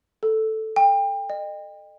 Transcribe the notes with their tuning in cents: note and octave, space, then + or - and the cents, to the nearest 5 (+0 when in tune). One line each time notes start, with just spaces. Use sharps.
A4 +0
G5 +30
D#5 -30